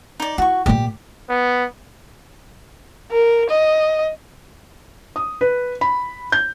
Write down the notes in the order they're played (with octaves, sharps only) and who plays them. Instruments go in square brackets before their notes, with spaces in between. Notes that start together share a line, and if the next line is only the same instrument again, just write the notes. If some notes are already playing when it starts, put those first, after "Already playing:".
[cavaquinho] D#4 D5
[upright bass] E4 [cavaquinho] F#4 C#6
[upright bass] D#1 A#2 [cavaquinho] G4
[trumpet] B3
[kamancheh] A#4
D#5
[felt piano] D#6
B4
B5
G6